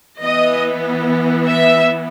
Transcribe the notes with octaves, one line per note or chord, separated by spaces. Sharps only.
E3 B3 D#5
E5